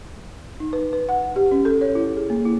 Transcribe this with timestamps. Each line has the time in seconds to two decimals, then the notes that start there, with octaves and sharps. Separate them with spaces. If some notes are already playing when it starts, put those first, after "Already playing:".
0.60 D#4
0.73 B4
0.93 B4
1.09 F#5
1.36 G4
1.52 C#4
1.65 A4
1.81 C#5
1.95 E4
2.17 G#4
2.30 A#3
2.45 E4